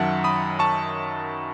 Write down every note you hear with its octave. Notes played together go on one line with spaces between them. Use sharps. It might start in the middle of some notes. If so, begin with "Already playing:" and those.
Already playing: F#2 D#3 F#3 E5 F#5 A5
B5 D#6
A5 C#6